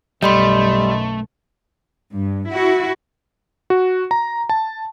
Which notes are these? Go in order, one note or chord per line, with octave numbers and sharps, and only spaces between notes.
B1 F#2 G3 A3 D#5 B5 C6
G2
E4 F#4
F#4
A#5
A5